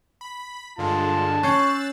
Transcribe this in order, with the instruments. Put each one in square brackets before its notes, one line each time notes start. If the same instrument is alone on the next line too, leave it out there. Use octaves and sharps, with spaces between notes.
[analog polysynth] B5
[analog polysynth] G2 D3 G#3 [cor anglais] F4 [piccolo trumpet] A5
[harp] C#4 G6 C7 [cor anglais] C#5 [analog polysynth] E6 F#6 A6